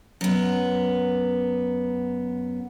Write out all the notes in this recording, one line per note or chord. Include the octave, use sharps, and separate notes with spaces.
F#2 B3